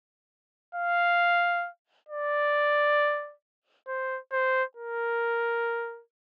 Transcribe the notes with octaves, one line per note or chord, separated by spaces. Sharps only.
F5
D5
C5
C5
A#4